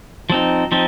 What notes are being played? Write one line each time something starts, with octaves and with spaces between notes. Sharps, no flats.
F3 C4 D#4
F3 C4 D#4